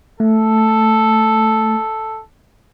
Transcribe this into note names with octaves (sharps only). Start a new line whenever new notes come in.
A3 A4